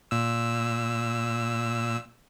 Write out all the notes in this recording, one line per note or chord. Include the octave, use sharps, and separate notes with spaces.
A#2 E6